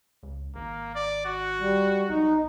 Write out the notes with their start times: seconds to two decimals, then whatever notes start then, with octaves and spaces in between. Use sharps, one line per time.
0.23 C#2
0.55 G#1 A#3
0.95 D5
1.25 F#4
1.60 G3
2.09 B1 D#4